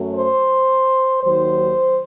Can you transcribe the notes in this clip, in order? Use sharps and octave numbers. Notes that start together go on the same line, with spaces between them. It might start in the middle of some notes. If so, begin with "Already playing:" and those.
Already playing: F#2 F#3 A3
C5
D#2 D#3 F#3 C5